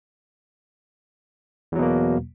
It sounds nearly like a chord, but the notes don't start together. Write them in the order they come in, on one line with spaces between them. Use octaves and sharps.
E2 F#3 B2 A#3